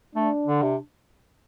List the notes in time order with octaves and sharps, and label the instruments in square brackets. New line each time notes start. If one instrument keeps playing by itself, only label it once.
[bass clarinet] A3 [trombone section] D4
[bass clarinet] D3
C3